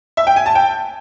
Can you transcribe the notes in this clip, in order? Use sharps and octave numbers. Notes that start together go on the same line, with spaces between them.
E5
G5
G#5
A5
G5